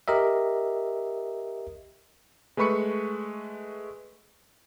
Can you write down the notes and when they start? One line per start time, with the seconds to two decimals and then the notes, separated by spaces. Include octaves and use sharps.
0.08 G4 A#4 D#5 E5
2.57 G#3 A3 B4 B5 C#6 C#7